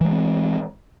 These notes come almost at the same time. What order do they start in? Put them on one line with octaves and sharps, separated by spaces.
E3 G#3 B3 C4